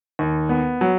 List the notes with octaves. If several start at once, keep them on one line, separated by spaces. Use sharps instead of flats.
D#2
B3
F#3